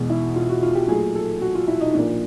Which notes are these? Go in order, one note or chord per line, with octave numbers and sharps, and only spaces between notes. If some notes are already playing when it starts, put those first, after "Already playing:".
Already playing: E2 B2 G#3
E4
F4
F#4
F4
G4
A#2 F#3 A3 G#4
A4
F#4
F4
E4
D#4
A#2 F3 A#3 D4